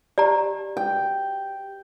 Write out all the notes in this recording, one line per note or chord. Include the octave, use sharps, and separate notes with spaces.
G4 D5 A#5
G5